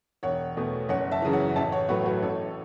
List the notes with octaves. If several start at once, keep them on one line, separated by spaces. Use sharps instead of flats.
E1 C#5 F#5
E2 B2 A3
F#1 C#5 F#5
E5 A5
F#2 C#3 E3
C#5 F#5
A1 E5 A5
C#5 F#5
A2 F#3 A3 F#4 B4
F#4 B4
A1 A4 C#5